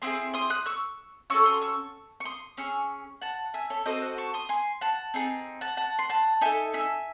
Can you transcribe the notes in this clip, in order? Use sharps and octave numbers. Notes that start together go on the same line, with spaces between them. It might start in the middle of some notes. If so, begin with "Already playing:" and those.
C4 E4 G#4 C6 D#6
C6 D#6
D#6 F#6
C#6 E6
C#4 F#4 A4 C#6 E6
C6 D#6
C#6 E6
C#6
C6 D#6
C#4 G#4 C#6 E6
F#5 A5
E5 G#5
A4 C#5
C4 F#4 A4 C5 D#5
D#5 F#5
A5 C#6
C6 D#6
G#5 C6
F#5 A5
C4 D#4 G#4
F#5 A5
F#5 A5
C6
F#5 A5
D#4 A4 E5 G#5
E5 G#5